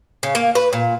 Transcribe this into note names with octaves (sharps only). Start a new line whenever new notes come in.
C#3
A#3
B4
A#2